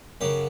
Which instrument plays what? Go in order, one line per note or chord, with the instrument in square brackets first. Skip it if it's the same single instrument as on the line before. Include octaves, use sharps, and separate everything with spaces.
[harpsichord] F#2 C#3 F#3 G4